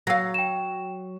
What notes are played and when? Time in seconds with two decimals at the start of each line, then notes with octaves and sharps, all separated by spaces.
0.07 F#3 F5 E6 A#6
0.34 G5 E7